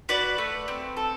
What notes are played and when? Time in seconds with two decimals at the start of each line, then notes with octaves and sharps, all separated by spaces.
0.09 F#4 B4 D5
0.38 A3
0.68 C4
0.97 A4